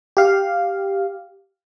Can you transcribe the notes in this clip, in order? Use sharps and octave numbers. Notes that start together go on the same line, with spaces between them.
G4 F5